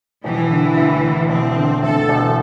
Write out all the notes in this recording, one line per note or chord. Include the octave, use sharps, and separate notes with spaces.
E1 E3
D3
D2
E1
E1 C4
D3
D2 A4
E1